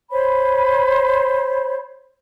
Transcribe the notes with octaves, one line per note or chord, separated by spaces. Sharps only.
C5 C#5 B5